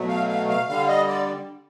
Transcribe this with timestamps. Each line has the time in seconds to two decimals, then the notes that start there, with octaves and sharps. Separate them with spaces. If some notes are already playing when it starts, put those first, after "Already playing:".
Already playing: B2 F#3 A3
0.08 F5
0.28 F5
0.49 F5
0.68 D3 G3 F5
0.88 D#5
1.08 D5